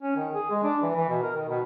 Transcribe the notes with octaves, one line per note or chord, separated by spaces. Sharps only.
C#4
D#3
G#4
G#3
D4
E3
E3
B2
A#4
D#3
B2